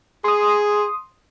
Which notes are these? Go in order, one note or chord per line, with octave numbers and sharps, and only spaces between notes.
G#4 C6 D#6